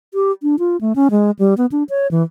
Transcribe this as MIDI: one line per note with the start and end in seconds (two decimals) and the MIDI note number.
0.14 0.32 67
0.43 0.56 62
0.59 0.77 65
0.81 0.93 57
0.96 1.08 61
1.11 1.31 56
1.39 1.54 55
1.58 1.66 59
1.72 1.83 62
1.89 2.07 73
2.11 2.23 52